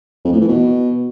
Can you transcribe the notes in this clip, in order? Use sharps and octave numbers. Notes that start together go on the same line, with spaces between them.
F2
A2
E3
B2